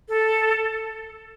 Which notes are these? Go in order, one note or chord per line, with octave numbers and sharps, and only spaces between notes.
A4